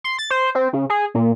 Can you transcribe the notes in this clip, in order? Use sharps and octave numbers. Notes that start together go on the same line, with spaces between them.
C6
A6
C5
C4
C#3
G#4
A#2